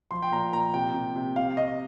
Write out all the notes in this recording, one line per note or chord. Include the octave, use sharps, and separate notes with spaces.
F3 C6
G5
A#2 A#5
A#2 A#5
C3 G5
C3
C3
C3 F5
C3 D#5